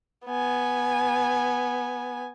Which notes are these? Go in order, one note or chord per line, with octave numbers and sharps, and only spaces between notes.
B3 G#5